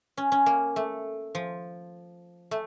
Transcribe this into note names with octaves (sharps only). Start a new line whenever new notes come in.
C#4
C#4
A#3
A3
F3
A3